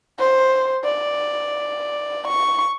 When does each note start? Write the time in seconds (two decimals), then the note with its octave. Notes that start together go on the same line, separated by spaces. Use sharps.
0.19 C5
0.84 D5
2.27 C#6